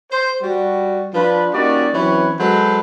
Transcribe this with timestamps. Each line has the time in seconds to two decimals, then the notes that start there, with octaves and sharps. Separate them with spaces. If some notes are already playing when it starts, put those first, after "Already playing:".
0.12 C5
0.42 G3 F#4
1.14 F3 D4 F4 B4
1.54 G3 A#3 C#4 D#4 F#4 D5
1.94 E3 F#3 C4 C#4 B4 C#5
2.39 F#3 G#3 F#4 A4 B4 C5